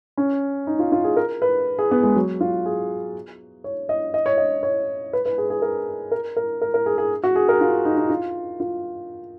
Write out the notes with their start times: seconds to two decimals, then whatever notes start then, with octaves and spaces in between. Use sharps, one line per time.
0.17 C#4
0.67 D#4
0.79 F4
0.92 F4
1.04 G#4
1.17 A#4
1.42 B4
1.79 G#4
1.91 B3
2.03 G#3
2.16 F#3
2.41 F4
2.66 G#4
3.64 C#5
3.89 D#5
4.14 D#5
4.26 C#5
4.38 D#5
4.63 C#5
5.13 B4
5.26 B4
5.38 G#4
5.50 G#4
5.62 A#4
6.12 A#4
6.37 A#4
6.62 A#4
6.74 A#4
6.86 G#4
6.98 G#4
7.23 F#4
7.36 G#4
7.49 A#4
7.61 F4
7.85 D#4
7.98 D#4
8.10 F4
8.60 F4